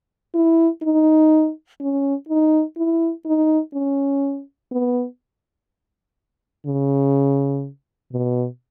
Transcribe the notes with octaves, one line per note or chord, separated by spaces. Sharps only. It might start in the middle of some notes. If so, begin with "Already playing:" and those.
E4
D#4
C#4
D#4
E4
D#4
C#4
B3
C#3
B2